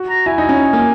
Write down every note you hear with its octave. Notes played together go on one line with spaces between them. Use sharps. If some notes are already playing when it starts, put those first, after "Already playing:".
Already playing: F#4
A#5
E4 G#5
D#4
C#4
A#3